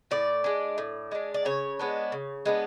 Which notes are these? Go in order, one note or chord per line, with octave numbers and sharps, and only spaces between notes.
A2 D5
G#3 D4
A2
G#3 D4
D5
C#3 C#5
G#3 B3 D4
C#3
G#3 B3 D4